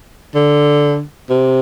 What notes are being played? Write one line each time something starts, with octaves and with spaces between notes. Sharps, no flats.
D3
C3